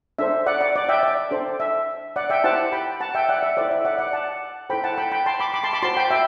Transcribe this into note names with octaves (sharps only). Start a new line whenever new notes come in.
D4 A4 C5 E5
D5 F#5
D5 F#5
D5
E5 G5
D5
D4 A4 C5
E5
D5 F#5
E5 G5
E4 G4 C5 F#5 A5
G5 B5
F#5 A5
E5 G5
D5 F#5
E5
E4 A4 C5 D5
E5
D5 F#5
D5 F#5
F#5 A5
E4 A4 C5 G5 B5
F#5 A5
G5 B5
G5 B5
A5 C6
B5 D6
B5 D6
A5 C6
B5 D6
F#4 C5 A5 C6
G5 B5
E5 G5